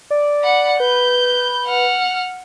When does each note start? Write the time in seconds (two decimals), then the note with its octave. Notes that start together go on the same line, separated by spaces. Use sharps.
0.10 D5
0.42 F#5 B5
0.80 B4 G6
1.65 F#5 F6